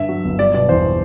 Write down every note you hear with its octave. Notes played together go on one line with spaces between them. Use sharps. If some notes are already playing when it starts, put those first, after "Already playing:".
Already playing: G2 D3 E5
F#3
G1
G3 D5
B2 D5
E2 C5